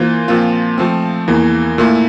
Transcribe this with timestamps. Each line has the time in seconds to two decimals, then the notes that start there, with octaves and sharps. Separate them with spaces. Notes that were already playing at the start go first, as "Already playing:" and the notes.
Already playing: E3 A#3 F4 C5
0.28 A#2 F3 C4 F4
0.78 F3 A3 C4
1.28 E2 E3 A#3
1.78 A#2 A3 E4